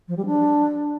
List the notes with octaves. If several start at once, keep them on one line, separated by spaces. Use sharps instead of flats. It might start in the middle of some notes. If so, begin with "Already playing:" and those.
F3
G3
D4